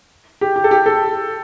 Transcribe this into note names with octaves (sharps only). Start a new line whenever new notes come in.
G4
G4
A4
G4
A4